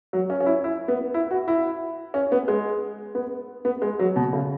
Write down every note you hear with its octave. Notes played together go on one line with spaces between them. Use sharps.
F#3
C#4
C#4
E4
E4
B3
E4
F#4
E4
C#4
B3
G#3
B3
B3
G#3
F#3
B2
C#3